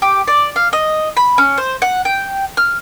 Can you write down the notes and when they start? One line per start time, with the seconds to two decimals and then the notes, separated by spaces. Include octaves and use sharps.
0.02 G4
0.28 D5
0.56 F5
0.73 D#5
1.17 B5
1.38 C#4
1.58 C5
1.82 F#5
2.05 G5
2.57 F6